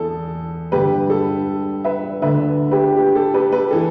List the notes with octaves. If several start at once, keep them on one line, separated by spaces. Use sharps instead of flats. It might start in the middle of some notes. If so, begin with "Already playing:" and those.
Already playing: E2 E3 A4
G2 D3 G4 B4
A4
B4 E5
D2 D3 B4 E5
G4 B4
G4
A4
G4 B4
G4 B4
E3 A4